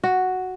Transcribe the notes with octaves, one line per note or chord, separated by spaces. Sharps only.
F#4